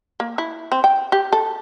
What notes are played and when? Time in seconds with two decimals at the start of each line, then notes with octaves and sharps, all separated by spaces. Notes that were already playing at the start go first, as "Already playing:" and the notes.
0.20 A#3
0.38 E4
0.72 C4
0.84 G5
1.12 G4
1.33 A4